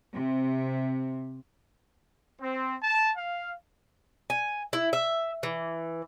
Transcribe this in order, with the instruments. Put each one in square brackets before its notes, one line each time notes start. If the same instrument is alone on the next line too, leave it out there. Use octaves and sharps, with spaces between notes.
[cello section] C3
[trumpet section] C4
A5
F5
[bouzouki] G#5
E4
E5
E3